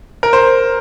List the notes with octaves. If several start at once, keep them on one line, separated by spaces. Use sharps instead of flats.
A#4
C5